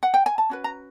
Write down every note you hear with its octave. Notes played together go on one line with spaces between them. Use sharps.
F#5
G5
G#5
A5
C#4 F#4 B4
A#5